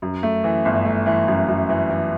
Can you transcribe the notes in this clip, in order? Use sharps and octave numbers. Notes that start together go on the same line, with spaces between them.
F#2
A3
E3
G1
A3
E3
F#2
F#2
E3
E3